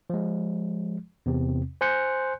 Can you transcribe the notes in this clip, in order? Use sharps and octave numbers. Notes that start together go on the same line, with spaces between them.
F3 G#3
E2 C3 C4
C5 G#5 C6 F#6 G6 C#7